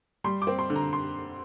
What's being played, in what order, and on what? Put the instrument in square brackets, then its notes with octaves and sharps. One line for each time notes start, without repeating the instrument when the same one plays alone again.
[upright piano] G3 C6
D6
C4
C6
D3
A#5
C6